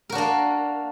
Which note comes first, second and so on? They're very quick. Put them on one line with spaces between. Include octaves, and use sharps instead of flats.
A#4 F#4 D4 A#3